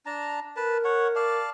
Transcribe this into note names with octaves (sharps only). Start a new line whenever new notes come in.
D4 A5 A#5
A#4 B4 A5
C#5 F#5
D5 F5 A5